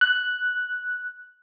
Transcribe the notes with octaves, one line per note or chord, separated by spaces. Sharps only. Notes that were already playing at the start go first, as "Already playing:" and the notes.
F#6